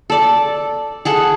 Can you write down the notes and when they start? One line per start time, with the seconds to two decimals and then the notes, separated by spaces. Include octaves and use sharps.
0.10 A4 D5
1.05 G#4 A4 F#5